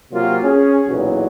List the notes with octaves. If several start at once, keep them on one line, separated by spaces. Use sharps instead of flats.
C3 F#3 A#3 C4 F4
C#4 G#4
B1 E2 A#2 F#3